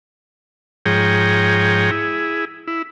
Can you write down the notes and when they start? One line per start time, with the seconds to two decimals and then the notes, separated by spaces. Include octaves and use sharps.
0.86 G#2 F3 G#4 C#5 G5 A#5
1.91 E4 G#4
2.67 E4